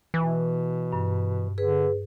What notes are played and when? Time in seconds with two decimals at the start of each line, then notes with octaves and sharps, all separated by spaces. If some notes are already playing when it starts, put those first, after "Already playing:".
0.14 B2 E3
0.92 G2
1.58 D3 G#4 B4